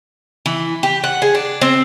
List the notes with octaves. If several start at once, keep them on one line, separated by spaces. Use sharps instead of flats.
E3
G4
F#5
G#4
D4
C4